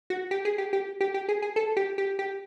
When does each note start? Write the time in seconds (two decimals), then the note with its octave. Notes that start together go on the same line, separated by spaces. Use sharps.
0.10 F#4
0.31 G4
0.45 G#4
0.58 G4
0.73 G4
1.01 G4
1.14 G4
1.29 G#4
1.42 G#4
1.56 A4
1.77 G4
1.98 G4
2.19 G4